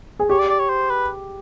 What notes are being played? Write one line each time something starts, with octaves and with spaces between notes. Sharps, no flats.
G#4
G4 C#5
D5
D5
C#5
C5
B4